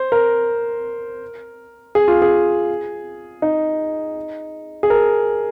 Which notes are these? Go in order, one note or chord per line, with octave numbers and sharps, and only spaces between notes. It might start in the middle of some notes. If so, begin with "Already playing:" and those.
Already playing: C5
A#4
G#4
F4
G#4
D#4
G#4
A#4